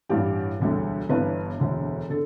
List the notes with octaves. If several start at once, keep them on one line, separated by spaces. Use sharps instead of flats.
A1 G2 G3 G4
E1 D2 D3 G3
G1 G2 E3 B4
E1 D2 D3
D3 A4